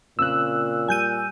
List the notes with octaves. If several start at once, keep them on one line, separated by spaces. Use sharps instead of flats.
A#2 C#3 C4 C#4 E6 F#6
G3 G#5 G6 D#7